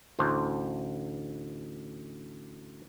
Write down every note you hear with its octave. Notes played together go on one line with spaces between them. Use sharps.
A1 D2 C5